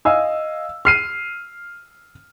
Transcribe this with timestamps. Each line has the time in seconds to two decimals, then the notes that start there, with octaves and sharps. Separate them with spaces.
0.05 D#5 F5 G#5 E6
0.85 F6 C7 D#7